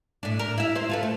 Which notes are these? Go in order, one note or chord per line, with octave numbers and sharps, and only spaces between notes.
A2 D4
A#4
E4 E5
E4 C5
F4 A4 B4
A3